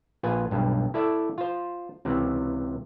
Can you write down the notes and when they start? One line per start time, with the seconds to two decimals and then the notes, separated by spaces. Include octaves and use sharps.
0.23 A#1 F4 B4 G#5
0.51 B1 G2
0.94 E4 A4 D5 E5
1.38 F4 C5
2.05 C#2 C3 E3